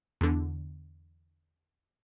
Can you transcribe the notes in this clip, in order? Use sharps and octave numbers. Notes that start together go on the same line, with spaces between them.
E2 D3